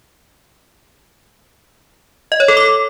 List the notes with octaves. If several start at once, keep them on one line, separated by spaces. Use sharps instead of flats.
D#5
C#5
A4
D6